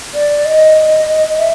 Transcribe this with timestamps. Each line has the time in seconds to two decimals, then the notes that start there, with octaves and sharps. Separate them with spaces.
0.14 D5
0.45 D#5
1.38 E5